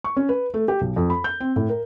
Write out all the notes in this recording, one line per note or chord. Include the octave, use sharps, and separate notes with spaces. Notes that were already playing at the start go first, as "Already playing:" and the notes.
C#6
C#4
B4
A3
G4
B1
F2
B5
G6
C4
A2
A#4